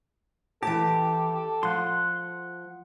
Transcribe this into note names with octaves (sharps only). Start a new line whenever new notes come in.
E3 G4 A4 A5
F3 F#5 C6